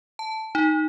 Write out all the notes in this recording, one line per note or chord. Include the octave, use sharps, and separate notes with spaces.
A5
D#4